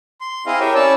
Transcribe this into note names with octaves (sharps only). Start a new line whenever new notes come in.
C6
C4 E4 G#4 D#5 F5
G4 A#4 C#5 E5
C#4 E4 C#5 D5 A5 E6